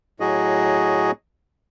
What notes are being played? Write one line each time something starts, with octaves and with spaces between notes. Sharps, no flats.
A2 F#3 F#4 G#4 D#5